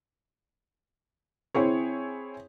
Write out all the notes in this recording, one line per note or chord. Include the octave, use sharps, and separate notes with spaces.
C4 E4 G#4 C#5